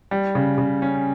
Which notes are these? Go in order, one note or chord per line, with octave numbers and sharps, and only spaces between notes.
G3
C#3
C#3
C#4